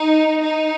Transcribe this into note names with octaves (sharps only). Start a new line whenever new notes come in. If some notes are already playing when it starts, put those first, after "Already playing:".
Already playing: D#4
D#4